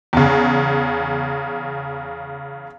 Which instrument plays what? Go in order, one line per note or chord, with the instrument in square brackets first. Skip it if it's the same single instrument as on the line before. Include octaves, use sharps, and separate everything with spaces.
[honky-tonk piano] E2 C#3